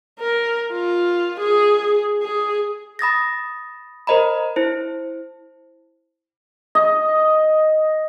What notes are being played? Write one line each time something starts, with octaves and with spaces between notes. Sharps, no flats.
A#4
F4
G#4
G#4
B5 D#6 A6 A#6
A#4 C5 D#5 A#5 B5
E4 C5
D#5